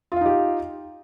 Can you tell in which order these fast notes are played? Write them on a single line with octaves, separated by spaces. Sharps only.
F4 F5 D#4 G4